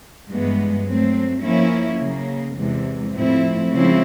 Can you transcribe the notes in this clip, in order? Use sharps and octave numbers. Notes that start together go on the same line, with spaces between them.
G2 E3 G#3 B3
F#3 A3 C4
F3 A#3 C#4 E4
C#3 F#3 A#3
E2 C3 E3 G#3
A2 F3 A3 C4 E4
C#3 F3 G#3 C4 E4